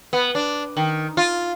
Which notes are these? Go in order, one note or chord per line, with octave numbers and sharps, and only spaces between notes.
B3
D4
D#3
F4